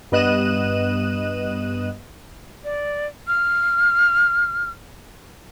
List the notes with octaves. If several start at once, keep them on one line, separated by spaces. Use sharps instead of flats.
G2 B3 D#5 F#6 D#7 E7
D5
F6